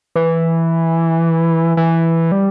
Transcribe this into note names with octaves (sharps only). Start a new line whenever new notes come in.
E3
E3
G3